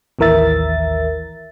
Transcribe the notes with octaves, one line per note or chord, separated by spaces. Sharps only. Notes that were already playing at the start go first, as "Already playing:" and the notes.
A1 D#2 E3 A#4 E5 A6